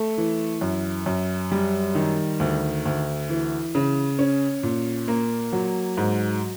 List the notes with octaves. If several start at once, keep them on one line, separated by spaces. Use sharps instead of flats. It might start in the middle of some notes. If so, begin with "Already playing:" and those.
Already playing: A3
E3
F#2
F#2
G3
D#3
D2
D2
E3
C#3
C#4
A#2
A#3
F#3
G#2